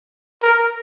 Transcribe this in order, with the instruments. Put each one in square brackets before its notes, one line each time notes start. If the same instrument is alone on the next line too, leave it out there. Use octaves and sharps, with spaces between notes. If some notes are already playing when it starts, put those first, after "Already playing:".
[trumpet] A#4